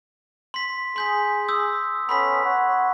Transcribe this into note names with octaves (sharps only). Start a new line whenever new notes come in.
C6 B6
G#4 C6 G6 B6
D#6 E6 G6
B3 C#4 A4 B5 C6 B6
C#5 F#5